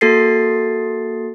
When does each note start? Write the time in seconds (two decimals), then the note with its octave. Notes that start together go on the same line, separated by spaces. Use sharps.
0.01 A#3 F#4 A4 A6 C7